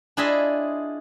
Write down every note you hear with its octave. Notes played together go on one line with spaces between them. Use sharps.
D4 E4 F4 G#4 D#5 E5